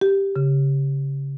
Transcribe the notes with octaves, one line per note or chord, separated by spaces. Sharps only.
G4
C#3